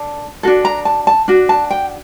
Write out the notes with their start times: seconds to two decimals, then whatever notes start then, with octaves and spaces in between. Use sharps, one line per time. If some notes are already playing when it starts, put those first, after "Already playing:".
Already playing: D4 A4
0.43 D4 F#4 A4
0.65 A#5
0.85 A5
1.07 A5
1.28 D4 F#4
1.49 A5
1.71 G5